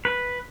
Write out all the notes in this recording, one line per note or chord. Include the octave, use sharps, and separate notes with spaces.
B4